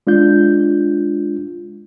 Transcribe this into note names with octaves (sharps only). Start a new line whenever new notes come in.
G#3 D4 F4 G6